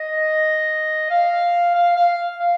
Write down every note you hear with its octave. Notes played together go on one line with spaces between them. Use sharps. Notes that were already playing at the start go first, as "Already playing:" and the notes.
Already playing: D#5
F5
F5
F5
F5